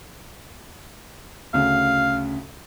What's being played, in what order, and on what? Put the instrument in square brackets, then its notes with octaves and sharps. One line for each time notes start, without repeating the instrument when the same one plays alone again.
[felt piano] D2 C#3 [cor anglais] F5